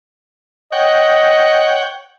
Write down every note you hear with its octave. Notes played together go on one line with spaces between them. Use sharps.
C#5 D#5 F#5 G5